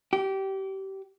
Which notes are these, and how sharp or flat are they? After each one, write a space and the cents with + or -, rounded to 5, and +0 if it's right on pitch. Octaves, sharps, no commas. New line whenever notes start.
G4 -25